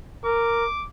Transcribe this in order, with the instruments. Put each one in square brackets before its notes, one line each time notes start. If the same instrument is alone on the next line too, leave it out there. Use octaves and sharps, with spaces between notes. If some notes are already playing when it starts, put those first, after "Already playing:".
[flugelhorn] A#4 [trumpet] D6